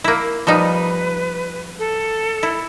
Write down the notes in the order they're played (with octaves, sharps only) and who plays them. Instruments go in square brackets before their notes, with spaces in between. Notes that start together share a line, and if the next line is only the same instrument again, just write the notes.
[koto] A#3 E4
[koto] F3 G3 D#4 [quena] B4
[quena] A4
[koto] E4